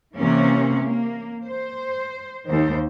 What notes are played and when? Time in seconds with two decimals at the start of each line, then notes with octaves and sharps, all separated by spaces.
0.16 C3 E3 A#3 C#4
0.81 A#3
1.46 C5
2.46 D#2 D#3 C5